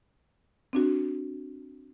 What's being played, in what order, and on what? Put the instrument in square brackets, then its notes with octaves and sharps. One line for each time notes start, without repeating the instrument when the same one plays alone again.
[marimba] C4 D4 F#4